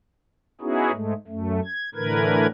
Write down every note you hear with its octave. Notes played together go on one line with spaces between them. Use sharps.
B3 C#4 D#4 E4 F#4 G#4
G#2 G#3 A3
F#2 A3
G#6
A2 D3 E3 A#4 B4 G#6